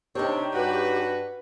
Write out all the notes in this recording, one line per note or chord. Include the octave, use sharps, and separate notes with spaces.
C3 C4 D4 D#4 G4 C#5
G2 F#4 B4